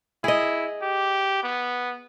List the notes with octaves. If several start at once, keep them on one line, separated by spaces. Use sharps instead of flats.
E4 G#4 D#5
G4
B3